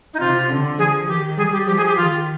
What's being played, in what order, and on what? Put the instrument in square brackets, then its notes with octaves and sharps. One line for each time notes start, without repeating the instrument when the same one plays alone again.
[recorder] D#4
[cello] C3 [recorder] F4
[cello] D3
[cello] F3 [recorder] G#4
[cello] D#3 [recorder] G4
[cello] G3 [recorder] G#4
[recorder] G4
[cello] F3 [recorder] G4
[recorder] G#4
G4
[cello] D#3 [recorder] F4